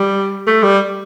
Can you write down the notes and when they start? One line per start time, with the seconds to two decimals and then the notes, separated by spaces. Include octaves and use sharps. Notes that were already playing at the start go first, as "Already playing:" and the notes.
Already playing: G3
0.47 A3
0.63 G3